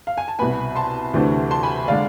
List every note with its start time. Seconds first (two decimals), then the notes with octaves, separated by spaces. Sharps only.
0.07 F5
0.18 G#5
0.28 A5
0.39 C2 B2 B3 G#5 B5
0.76 A5 C6
1.14 D2 C3 E3 A3 D4
1.51 A5 C6
1.63 G#5 B5
1.88 D3 G#3 D4 D5 F5